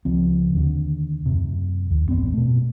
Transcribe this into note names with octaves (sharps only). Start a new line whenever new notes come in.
C#2 F3 C4
D#2 D3
F#2 C3
D#2
A1 F#2 B3 C4
B2 A3